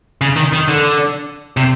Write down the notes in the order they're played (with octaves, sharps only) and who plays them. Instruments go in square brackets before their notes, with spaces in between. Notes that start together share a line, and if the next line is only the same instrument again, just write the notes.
[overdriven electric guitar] C#3
D#3
D#3
D3
C3